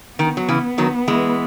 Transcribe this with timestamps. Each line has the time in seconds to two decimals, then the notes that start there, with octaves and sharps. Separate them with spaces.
0.18 D#3 B3
0.37 F#3
0.49 C#3 E3
0.78 D#3 F#3
1.08 E3 G#3